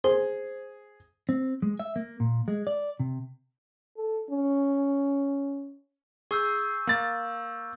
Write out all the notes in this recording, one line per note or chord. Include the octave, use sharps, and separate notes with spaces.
G#4 C5
C4
G#3
E5
A#3
A#2
G#3
D5
C3
A4
C#4
G#4 C#6 E6 G6
A#3 A6